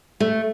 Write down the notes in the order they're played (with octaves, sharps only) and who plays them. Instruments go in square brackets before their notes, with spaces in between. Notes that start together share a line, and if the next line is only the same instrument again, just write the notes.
[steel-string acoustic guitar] A3